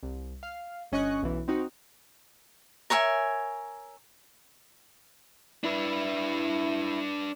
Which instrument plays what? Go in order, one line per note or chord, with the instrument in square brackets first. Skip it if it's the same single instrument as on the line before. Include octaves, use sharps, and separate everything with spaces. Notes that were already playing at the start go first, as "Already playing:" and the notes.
[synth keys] C2
F5
G1 C#4 D#5 C#6 F#6
B1 E3
C4 D#4 F#4
[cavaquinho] A#4 C#5 E5 G#5
[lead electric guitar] D4 B4 [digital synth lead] E4